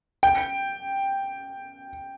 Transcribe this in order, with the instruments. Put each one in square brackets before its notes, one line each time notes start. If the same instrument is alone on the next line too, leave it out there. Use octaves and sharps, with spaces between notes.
[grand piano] G5